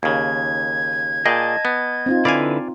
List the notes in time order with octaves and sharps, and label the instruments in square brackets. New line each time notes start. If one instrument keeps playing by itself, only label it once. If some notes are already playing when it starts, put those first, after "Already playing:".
[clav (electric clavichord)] D#2 C#3 [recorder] G#6
[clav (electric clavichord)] A#2 G#4 G5 [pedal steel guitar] D#5 A5
[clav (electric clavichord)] B3
[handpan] C4 D#4 F4
[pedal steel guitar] D3 E4 B4 [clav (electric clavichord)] D5 F5 G#5